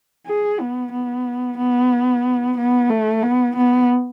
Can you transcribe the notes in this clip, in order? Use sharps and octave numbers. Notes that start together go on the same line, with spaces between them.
G#4
B3
B3
B3
B3
A3
B3
B3